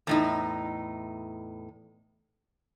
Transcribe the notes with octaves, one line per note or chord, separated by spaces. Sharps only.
E2 A2 D#4